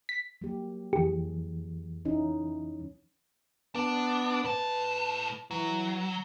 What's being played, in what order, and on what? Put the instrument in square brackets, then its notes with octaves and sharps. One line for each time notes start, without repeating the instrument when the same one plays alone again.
[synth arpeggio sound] B6
[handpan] F#3 A#3 G4
[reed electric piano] F2 E3 [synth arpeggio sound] G4 [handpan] G#4
[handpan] C#4 D#4 E4
[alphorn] B3 [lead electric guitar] D4
[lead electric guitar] A2 A5 [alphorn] B4
[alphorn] E3 [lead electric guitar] F#3